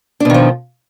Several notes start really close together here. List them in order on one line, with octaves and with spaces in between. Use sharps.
D4 B2 D#3 F3